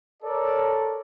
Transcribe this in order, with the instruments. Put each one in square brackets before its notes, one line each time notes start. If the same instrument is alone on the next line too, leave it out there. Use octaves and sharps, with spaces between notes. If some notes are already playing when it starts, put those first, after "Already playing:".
[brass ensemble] A4 A#4 C#5 D5